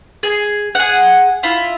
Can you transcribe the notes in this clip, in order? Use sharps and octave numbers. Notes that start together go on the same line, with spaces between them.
G#4
G#4 F#5
E4 F4